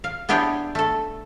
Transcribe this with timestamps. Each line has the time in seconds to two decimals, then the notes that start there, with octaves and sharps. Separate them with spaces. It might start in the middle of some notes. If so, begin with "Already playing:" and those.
0.04 F5
0.29 B3 D4 E4 G4 G#4 C#5
0.75 A3 A4